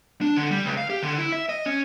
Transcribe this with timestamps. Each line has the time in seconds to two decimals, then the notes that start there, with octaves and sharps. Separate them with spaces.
0.21 D4
0.37 D3
0.51 G3
0.65 C#2
0.77 F5
0.90 G4
1.03 D3
1.18 E4
1.32 E5
1.49 D#5
1.66 C#4